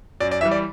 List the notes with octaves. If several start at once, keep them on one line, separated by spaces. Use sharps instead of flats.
F#2 D5
D5
E3 G3 E5
D5